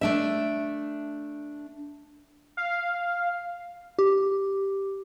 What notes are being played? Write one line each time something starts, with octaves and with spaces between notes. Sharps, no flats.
A3 D4 E5
F5
G4